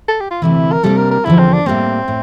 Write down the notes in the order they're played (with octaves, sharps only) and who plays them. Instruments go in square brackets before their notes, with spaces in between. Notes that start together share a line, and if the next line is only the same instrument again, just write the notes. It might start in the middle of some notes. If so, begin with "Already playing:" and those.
[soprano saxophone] A4
G4
F4
[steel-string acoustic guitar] D2 C3 E3 [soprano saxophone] E4
[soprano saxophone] A#4
[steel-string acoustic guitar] C3 G3 A#3 D4 G4 [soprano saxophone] A4
[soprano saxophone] A#4
A#4
[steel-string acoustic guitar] E2 D3 F3 [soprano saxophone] E4
[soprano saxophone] C4
D4
[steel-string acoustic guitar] A2 G3 A#3 [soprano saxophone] C4
[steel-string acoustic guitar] A2